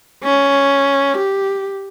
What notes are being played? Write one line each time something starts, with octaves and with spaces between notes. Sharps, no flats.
C#4
G4